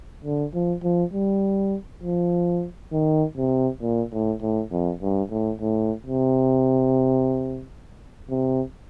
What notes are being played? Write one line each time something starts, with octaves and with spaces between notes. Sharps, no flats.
D3
F3
F3
G3
F3
D#3
C3
A#2
A2
A2
F2
G2
A2
A2
C3
C3